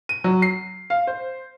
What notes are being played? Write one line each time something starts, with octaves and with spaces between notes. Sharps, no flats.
D#7
F#3
C7
F5
C5